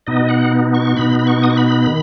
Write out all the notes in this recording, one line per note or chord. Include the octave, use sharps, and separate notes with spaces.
B2 B3 D#4 D#5
F#5
C#6
B2 B3 D#4 B5
B5
C#6
D#6
C#6
B5
D#3